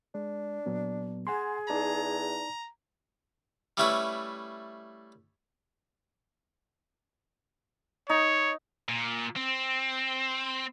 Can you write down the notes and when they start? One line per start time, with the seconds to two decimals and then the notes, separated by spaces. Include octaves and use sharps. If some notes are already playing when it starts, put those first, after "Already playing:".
0.15 G#3 D4
0.66 A#2 F#3 B3
1.27 G#4 F#5 G#5 C6
1.69 E2 D#4 D5 A5 A#5
3.77 G3 A3 C#4 E4 B4 C#5
8.09 D#4 C#5
8.89 A#2
9.36 C4